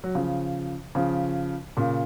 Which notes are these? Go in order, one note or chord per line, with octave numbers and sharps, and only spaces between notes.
F#3
C#3 F3
C#3 F3
A#2 C#3